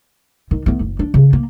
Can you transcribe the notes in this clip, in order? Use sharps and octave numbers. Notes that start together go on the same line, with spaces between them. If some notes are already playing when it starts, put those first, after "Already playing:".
D#3
A3 B3
F#1
D4
C#3
A#3